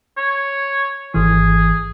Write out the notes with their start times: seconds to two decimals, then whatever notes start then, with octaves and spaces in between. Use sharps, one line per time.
0.17 C#5
1.14 G#1 E3 G#4